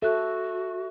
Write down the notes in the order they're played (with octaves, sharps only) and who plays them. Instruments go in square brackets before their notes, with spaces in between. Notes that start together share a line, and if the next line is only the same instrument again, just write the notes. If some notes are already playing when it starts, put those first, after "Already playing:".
[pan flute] F#4 [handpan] A4 [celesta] E5 F#6